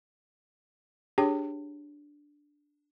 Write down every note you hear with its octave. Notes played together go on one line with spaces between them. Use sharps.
D4 G4 G#4 C#5 G5